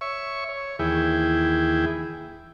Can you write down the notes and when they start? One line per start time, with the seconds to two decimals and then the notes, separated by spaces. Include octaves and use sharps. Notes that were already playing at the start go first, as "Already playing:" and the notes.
0.01 C#5 E5 C#6
0.49 C#5
0.79 D#2 E3 E4 G#4 G5